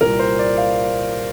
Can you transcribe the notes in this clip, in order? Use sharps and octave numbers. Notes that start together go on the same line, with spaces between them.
C2 A#2 G3 A#4
C5
D5
F5